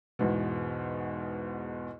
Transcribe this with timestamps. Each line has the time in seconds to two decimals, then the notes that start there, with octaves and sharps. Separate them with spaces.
0.19 E2 G#2 B2